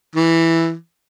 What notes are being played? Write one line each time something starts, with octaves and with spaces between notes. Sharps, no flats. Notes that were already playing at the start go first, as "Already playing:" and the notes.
E3